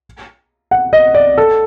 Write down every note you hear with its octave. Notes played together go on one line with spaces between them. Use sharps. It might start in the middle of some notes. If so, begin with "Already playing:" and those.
F#5
D#5
D5
A4